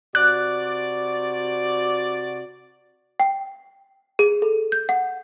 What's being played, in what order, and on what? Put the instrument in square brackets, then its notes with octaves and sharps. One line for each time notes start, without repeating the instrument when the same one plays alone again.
[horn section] C3 F#4 D5 [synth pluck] F#6
[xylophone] G5
G#4
A4
G6
F#5